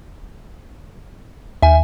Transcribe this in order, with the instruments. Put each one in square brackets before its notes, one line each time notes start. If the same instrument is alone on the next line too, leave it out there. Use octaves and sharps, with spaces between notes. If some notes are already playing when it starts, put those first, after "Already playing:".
[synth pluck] D#2 [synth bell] E5 G#5